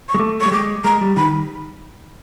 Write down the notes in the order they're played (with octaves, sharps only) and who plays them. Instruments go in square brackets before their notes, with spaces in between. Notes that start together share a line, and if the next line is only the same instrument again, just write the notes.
[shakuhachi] C#6
[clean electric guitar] G#3
[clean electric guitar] A3 [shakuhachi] D6
[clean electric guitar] G3 [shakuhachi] C#6
[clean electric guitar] G#3 [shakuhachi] D6
[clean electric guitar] G#3 [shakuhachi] A#5
[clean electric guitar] G3
[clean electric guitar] D#3 [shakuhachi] B5